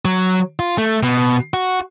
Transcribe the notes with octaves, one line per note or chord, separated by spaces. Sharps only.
F#3
F4
A3
B2
F#4